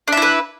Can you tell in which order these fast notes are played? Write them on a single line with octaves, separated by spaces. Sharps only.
D4 E5 E4 B4